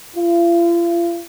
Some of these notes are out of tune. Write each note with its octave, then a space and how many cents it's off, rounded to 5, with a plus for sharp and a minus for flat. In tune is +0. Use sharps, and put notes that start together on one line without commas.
F4 -40